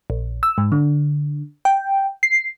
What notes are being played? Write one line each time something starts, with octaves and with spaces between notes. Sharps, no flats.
A#1
E6
G#2
D3
G5
C7